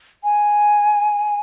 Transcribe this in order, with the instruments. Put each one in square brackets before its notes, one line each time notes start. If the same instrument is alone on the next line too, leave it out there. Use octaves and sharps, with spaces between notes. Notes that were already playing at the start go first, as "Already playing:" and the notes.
[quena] G#5